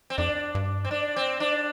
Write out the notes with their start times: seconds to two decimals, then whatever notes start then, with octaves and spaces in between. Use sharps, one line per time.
0.10 C4
0.18 F2 D4
0.55 G2
0.85 C4
0.91 D4
1.16 C4
1.40 D4